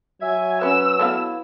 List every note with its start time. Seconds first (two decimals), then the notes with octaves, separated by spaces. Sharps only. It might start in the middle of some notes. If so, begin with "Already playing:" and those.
0.22 F#3 E5 G#5
0.61 C#4 F#4 B4 E6
0.99 A3 B3 E4 F5